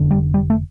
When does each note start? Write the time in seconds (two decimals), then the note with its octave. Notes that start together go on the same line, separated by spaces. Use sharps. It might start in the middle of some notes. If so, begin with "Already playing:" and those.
Already playing: F1 D3
0.11 G3
0.34 G3
0.50 A3